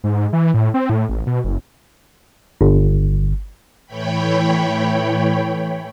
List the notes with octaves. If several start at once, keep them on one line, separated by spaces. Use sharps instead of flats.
G#2
E3
A2
C4
A2
A1
B2
F#1
G1
A2 E3 C#5 G5 B5